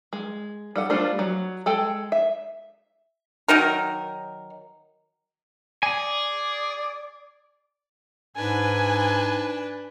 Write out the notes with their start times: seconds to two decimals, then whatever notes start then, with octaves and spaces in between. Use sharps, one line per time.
0.13 G#3
0.76 G3 A4 F#5
0.90 G3 A3 D4 F4 C5
1.19 F#3
1.66 G#3 A4 G5
2.12 E5
3.48 D#3 F#3 D#4 A#4
5.83 G#4 D5 G#5
8.36 G#2 D4 B4 G#5